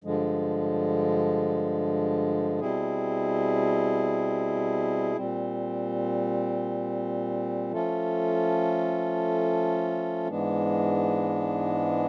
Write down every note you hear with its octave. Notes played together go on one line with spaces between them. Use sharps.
G2 D3 F3 G#3
B2 G3 C4 E4 G#4
A#2 G3 C4
F3 A3 C#4 F4 A4
G#2 E3 G#3 B3 D4